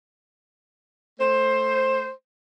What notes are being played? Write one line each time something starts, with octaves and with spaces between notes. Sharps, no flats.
A3 C5